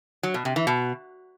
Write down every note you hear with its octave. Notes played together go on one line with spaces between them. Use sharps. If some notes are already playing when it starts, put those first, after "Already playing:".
F#3
B2
C3
E3
B2